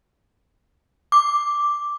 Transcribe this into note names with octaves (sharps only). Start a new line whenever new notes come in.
D6